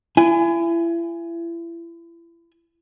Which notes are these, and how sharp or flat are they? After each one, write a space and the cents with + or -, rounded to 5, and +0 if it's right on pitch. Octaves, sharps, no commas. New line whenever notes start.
E4 +35 G#5 -5